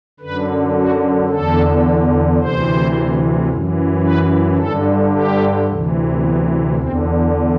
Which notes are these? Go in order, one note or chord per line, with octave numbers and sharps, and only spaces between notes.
F#2 D3 B4
F#4
E2 D3 A4
D2 C3 E3 C5
F#2 E3
B4
G2 D3 A4
G4
D2 C3 E3
B3
E2 D3 C4